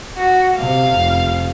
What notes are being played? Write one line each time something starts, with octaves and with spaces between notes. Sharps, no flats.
F#4
C3 F5
F1